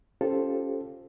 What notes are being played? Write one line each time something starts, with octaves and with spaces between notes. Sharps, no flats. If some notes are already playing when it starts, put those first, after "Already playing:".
C#4 F4 G4 A4 C5